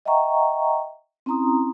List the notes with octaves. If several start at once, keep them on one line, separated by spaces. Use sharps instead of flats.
D#5 E5 F#5 G5 A#5 C#6
C4 C#4 E4 A#5 C6 D#6